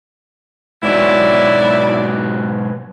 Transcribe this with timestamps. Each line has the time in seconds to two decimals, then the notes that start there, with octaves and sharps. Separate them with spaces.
0.83 G#2 B2 F#3 E4 D5